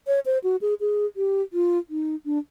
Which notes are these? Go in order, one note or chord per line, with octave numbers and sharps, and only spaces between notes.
C#5
C5
F#4
G#4
G#4
G4
F4
D#4
D4